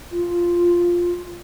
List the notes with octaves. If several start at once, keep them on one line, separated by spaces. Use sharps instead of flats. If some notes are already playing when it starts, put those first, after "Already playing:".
F4